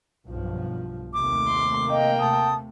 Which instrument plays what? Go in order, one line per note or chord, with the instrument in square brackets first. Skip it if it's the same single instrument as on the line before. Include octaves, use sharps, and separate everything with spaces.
[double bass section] B1 G2 F3
[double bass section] D#2 C3 A3 [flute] D6
[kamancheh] C6
[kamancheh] A#3 G5 [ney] D#5
[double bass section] C3 A3 [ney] A5 [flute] D#6